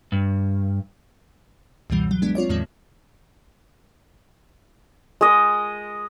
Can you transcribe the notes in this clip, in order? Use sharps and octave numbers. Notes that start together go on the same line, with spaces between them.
G2
C#2 F#2 B2 E3 G3
F#3
G#3 B3 D4
C4 F4 C#5 D5
E2 A2 D#3 F3 G#3 A#3
G#3 D#5